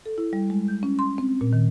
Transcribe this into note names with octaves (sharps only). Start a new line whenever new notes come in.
A4
E4
G3
G#3
G6
C#4
C6
C4
A#2
D#3